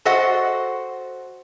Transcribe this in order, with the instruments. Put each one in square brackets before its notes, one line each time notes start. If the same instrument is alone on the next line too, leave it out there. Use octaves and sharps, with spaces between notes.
[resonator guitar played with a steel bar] F#4 A4 C5 D#5 F#5